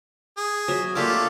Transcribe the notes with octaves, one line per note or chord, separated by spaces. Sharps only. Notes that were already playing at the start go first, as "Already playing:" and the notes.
G#4
F#3 E5
A3 A#3 D4 F4 G4 D6